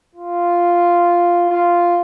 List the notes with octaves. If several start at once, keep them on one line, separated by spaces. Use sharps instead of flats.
F4
F4